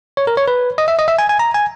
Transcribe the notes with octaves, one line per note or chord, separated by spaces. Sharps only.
C#5
A#4
C#5
B4
D#5
E5
D#5
E5
G#5
G#5
A#5
G#5